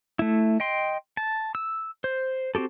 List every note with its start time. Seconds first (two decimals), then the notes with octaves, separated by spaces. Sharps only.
0.19 A3 E4
0.60 D#5 G5 C6
1.17 A5
1.55 E6
2.04 C5
2.55 C4 F#4 G4 A4